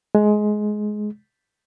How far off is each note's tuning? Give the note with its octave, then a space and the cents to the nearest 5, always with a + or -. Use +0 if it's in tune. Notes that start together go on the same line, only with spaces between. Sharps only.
G#3 +15